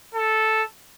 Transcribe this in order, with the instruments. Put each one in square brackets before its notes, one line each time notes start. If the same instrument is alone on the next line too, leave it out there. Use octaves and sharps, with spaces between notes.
[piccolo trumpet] A4